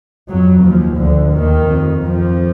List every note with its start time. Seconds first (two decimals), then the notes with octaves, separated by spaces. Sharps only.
0.28 F2 F#3
0.64 D#2 F3
0.99 D2 D3
1.34 D#2 D#3
1.69 F2
2.04 F2 F3